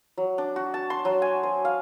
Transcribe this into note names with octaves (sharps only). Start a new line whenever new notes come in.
F#3
D4
F#4
A5
C6
F#3
G#5
C5
F5